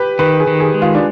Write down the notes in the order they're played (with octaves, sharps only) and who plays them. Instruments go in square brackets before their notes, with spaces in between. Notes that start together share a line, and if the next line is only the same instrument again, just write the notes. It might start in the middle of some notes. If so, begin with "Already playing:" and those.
Already playing: [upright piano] G4 B4
[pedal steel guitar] D#3 [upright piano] B4
[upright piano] G#4
[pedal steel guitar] D#3
[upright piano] G#4
[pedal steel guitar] G#3
[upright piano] F4
D4